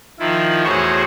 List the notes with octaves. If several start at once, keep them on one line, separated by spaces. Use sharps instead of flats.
D#3 F3 E4 F4
E2 A2 F#4 G#4 C5 C#5